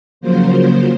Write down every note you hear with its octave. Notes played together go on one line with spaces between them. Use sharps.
C#3 F3 F#3 A#3 C5